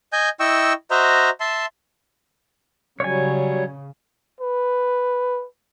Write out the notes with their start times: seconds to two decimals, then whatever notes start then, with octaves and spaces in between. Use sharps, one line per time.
0.13 D#5 G#5 G6
0.40 E4 D#5 G5 C#6 E6
0.91 F#4 C5 D#5 E5 A#5
1.40 E5 A5 C6
3.00 C#3 F#3 G3 C#5 G#5
4.41 B4